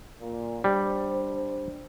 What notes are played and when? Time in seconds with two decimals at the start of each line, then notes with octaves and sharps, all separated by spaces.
0.21 A#2
0.64 G3 D4 C5